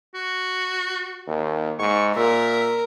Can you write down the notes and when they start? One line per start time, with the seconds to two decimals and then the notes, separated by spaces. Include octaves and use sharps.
0.15 F#4
1.27 D#2
1.79 G#2 C#6
2.16 A#2 A#4 E5